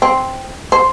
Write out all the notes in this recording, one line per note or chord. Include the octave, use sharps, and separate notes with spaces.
C4
C5